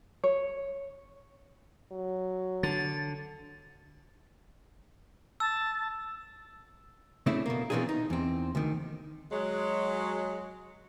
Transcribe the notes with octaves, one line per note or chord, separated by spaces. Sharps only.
C#5
F#3
D3 A6
A5 E6
C#3 A3 C4 D4 E4
B2 A#3
B2 E3 A#3 C4 D4 G#4
D#4
E2 C4
D2 D#3
F#3 G#3